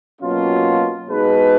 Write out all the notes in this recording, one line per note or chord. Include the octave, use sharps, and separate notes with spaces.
B2 F#3 A#3 C#4 F4
B2 G#3 D#4 G#4 B4